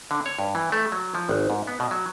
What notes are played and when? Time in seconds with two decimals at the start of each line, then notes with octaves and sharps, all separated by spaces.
0.11 D3
0.26 C#5
0.39 G2
0.55 E3
0.72 A3
0.92 F#3
1.15 F3
1.29 G#1
1.50 G#2
1.67 B3
1.80 B2
1.91 F#3